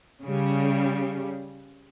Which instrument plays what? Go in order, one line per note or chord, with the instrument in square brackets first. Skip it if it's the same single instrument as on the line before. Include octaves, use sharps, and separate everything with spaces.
[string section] C#3 G3